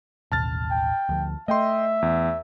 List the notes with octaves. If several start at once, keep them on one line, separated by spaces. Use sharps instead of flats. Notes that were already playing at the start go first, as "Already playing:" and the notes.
A1 D#2 B2 A5 F6 A6
G5
D2 F3
A3 D#5 E5 G5 C6
E2